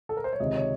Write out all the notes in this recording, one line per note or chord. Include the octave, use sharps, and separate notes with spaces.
A4
A#4
C5
C#5
C#2 C3 D#3 D#5
C#5